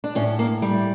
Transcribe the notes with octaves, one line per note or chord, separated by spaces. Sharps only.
D4
A2 C#4
A#3
G3 A3